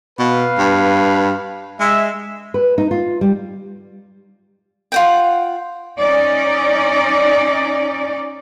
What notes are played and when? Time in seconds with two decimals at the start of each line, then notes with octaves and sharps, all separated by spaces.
0.19 B2 B4 F5
0.58 G2
1.80 G#3 E5
2.54 B4
2.78 D#4
2.91 F4
3.21 G3
4.92 F4 F#5 G5
5.99 C#4 D#4 D5